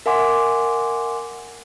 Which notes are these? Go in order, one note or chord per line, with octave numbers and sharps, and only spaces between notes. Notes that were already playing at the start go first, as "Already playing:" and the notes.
A#4 E5 F#5 G#5 C6 D6